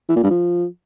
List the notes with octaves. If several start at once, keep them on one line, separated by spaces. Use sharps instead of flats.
E3
A#2
G2
F3